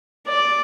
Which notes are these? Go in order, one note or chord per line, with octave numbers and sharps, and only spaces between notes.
D5